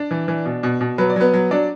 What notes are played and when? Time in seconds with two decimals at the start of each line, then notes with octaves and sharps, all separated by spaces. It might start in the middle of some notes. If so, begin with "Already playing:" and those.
Already playing: D4 D5
0.11 E3
0.28 E3
0.45 B2
0.63 B2
0.81 B2
0.98 F#3 B4
1.10 D5
1.16 F#3 B3 B4
1.33 F#3
1.51 F#3 D4 D5